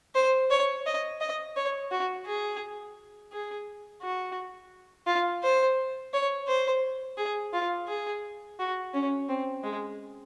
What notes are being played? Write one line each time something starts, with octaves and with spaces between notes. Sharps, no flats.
C5
C#5
D#5
D#5
C#5
F#4
G#4
G#4
F#4
F4
C5
C#5
C5
G#4
F4
G#4
F#4
C#4
C4
G#3